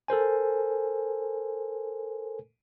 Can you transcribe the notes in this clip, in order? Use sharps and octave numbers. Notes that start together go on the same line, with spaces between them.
A4 A#4 C5 G#5